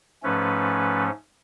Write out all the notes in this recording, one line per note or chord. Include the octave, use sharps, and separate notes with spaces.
G#2 F3 A3 C#4 B4